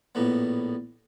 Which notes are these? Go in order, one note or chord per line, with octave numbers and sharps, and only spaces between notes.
A#1 A2 B3